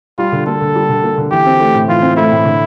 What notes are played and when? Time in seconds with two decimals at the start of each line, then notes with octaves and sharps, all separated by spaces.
0.18 G3 F4
0.32 D3
0.46 A#3 A4
0.61 D3
0.75 G3
0.89 D3
1.04 A#3
1.18 D3
1.31 E3 G4
1.46 C4
1.60 A3
1.74 A2
1.89 E3 F4
2.03 C4
2.17 A3 E4
2.32 A2
2.45 D3